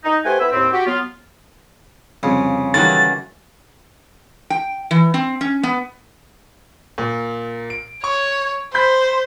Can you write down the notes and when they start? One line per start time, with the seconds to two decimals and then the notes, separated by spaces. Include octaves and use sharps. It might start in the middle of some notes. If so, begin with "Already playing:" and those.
0.04 D#4
0.25 A3 G4 B4 C5 F#5 G#5
0.40 B3 E4 E5
0.52 D#2 A2 C4
0.73 F#4 G4
0.86 F#3 B3 F4
2.23 C2 F2 C#3
2.74 D#3 E3 F#3 G3 A#3 A4 A6
4.50 G5
4.91 E3
5.14 C4
5.41 C#4
5.63 B3
6.98 A#2
7.70 D7
8.04 C#5 C#6
8.74 C5 B5 G6 B6